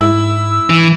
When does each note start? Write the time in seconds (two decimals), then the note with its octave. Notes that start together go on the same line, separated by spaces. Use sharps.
0.01 G#2 E4 E6
0.70 E3